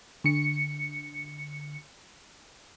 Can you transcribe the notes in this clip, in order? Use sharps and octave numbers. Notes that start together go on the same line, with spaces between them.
D3 C#7